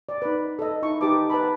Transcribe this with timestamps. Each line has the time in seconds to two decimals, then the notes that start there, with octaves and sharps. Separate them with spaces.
0.09 D5
0.22 D#4 B4
0.59 A4 D#5
0.82 D#4 E4 C#6
1.01 D#4 G4 B4 A5 D6
1.30 B4 G5 A5 B5